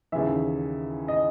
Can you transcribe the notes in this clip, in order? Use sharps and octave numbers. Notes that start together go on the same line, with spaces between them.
D#2 C#3 E3 E5
D#5